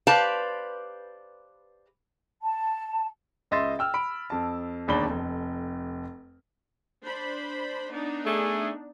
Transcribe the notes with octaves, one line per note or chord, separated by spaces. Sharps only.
G4 B4 C5 D5 F5 A5
A5
C#2 D#5 E5 C6 A6
G5 E6 F6
B5 D7
F2 A5
E1 D#2 D4 B5 G7
F1 F2
D4 C5 B5
B3 D4 D#4
A3 G#4